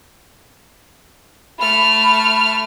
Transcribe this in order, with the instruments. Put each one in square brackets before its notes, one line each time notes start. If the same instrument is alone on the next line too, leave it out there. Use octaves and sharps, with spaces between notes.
[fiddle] A3 F6 [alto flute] B5